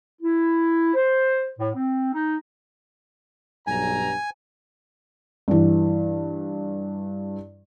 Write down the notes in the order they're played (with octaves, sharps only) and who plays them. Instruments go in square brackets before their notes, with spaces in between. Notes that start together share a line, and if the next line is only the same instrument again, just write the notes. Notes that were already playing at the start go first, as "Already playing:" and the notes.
[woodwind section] E4
C5
A2
C4
D#4
[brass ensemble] B1 G2 A#5 [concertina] G#5
[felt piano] G2 E3